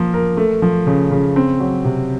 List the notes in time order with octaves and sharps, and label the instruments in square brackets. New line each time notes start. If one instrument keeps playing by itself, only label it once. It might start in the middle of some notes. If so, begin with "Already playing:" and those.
Already playing: [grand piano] F3 A#3
A#4
A3
F3
C#3
C#3
C4
F#3
C3